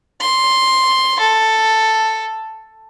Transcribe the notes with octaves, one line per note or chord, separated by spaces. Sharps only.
C6
A4